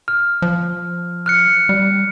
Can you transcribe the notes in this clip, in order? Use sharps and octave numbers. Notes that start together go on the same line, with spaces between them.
F6
F3
F6 F#6 C#7
G3